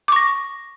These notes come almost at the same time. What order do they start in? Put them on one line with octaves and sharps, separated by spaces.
D6 C#6 A#6